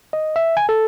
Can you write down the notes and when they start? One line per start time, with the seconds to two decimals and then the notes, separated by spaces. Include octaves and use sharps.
0.13 D#5
0.36 E5
0.57 G#5
0.69 A4